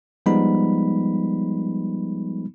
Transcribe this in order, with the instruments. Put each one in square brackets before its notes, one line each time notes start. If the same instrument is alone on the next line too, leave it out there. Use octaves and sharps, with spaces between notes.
[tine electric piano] F3 G3 G#3 B3 D#4 B5